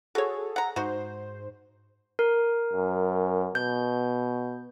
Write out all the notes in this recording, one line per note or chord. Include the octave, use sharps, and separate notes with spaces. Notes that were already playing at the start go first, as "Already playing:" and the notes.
F#4 G#4 A4 C#5
F#5 A#5
G#2 D#4 F#4 C5
A#4
F#2
B2 G6